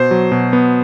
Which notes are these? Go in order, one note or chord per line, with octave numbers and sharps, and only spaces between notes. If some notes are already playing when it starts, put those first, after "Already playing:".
Already playing: B2 C5
F#3
B2
B3